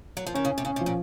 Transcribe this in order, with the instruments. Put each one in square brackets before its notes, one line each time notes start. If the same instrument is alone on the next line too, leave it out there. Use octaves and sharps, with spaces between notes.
[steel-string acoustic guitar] F#3
F3
[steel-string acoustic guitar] D#3 [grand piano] C#4
[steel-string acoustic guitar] C#3
[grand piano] C#4
[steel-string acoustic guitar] C3
[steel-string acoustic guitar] C#3 [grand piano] C#4
[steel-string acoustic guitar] C3
[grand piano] F3
[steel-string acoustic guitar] A#2